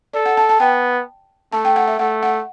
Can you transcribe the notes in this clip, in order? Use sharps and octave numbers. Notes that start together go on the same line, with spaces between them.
A4 D5
F#5
A5
A5
B3 G5
A3 A5
G5
F#5
E5
A3 F#5
F#5